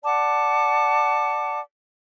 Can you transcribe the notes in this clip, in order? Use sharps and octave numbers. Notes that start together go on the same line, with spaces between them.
D5 F#5 A5 D6